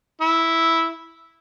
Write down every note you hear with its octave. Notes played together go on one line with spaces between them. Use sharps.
E4